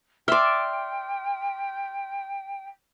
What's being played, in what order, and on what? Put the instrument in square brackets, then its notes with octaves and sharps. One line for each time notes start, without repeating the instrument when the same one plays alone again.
[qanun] D5 E5 [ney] G5 [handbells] C6 F6